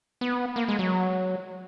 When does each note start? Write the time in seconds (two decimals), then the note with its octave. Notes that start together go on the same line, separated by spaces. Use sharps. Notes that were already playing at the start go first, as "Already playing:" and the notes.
0.21 B3
0.56 A#3
0.68 G#3
0.79 F#3